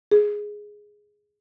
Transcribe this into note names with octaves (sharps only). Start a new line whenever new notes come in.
G#4